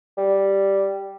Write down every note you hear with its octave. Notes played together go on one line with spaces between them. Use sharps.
G3